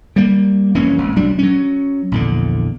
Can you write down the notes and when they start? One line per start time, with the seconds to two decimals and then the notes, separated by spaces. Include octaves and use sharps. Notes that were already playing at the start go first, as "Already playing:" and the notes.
0.16 G3 A#3
0.75 F1 E3 A#3 C#4
0.98 G#1
1.16 B1 F#3 G3 D4
1.39 F#3 C#4
2.12 A#1 E2 D3